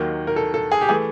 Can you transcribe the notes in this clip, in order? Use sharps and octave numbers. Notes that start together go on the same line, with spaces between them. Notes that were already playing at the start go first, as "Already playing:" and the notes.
Already playing: D#2 D#3 F#3 A#3
A#4
A4
A4
G#4
G4
E3 A3 G#4